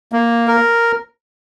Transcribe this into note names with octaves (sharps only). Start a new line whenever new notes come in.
A#3
A#4